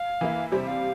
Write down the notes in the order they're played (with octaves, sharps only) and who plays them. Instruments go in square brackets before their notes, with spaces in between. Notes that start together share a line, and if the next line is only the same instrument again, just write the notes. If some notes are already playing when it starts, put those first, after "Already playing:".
Already playing: [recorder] F5
[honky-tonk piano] E3 A#3 E4
[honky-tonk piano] C3 G3 C4 [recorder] E5
[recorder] F5